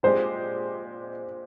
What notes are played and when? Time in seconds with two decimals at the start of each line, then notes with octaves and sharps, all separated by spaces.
0.03 A#2 G#3 D4 G4 C5